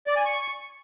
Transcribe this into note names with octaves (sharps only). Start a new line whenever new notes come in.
D5
G#5
C#6